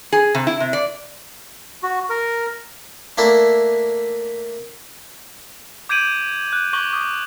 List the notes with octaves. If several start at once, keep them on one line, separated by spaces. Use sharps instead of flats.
G#4
C3
E4
C3
D5
F#4
A#4
A3 A#3 D4 E4
D6 G6 G#6 D7 D#7 F#7
F#6
C#6 D6 F#6 G#6 F#7 G7
D6 D#6